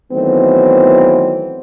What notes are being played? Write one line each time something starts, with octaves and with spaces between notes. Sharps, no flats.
D#3 E3 F#3 A3 B3 C4